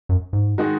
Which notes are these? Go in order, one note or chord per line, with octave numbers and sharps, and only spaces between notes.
F#2
G#2
D#3 G#3 D#4 F#4